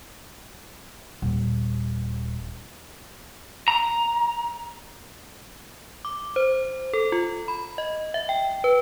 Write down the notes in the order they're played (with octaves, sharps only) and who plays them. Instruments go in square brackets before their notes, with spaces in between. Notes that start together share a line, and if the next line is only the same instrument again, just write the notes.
[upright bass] D#1
[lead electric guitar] A#5
[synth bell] D6
C5
A4
F4
B5
D#5
E5
G5
B4